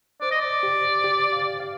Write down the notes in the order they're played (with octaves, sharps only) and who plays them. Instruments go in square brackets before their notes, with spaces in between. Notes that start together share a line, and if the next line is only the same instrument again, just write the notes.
[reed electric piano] C5 [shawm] D5
[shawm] D#5
D5
[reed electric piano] G4
G4
F5
F5